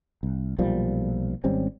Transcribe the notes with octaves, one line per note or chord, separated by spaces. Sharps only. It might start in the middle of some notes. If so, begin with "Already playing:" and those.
C2
B1 A#2 F3 G3
G#1 G3 C4 C#4